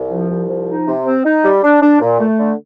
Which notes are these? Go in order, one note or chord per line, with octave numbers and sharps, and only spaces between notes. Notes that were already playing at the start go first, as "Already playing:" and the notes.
Already playing: C2
F3
C2
F3
D#4
C3
C4
D#4
G3
D4
D4
A#2
A3
D3